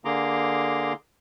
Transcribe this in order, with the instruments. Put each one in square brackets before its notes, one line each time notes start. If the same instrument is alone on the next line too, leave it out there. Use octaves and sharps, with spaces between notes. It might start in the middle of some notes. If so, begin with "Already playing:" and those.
[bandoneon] D3 A#3 G#4 A#5 C6 D6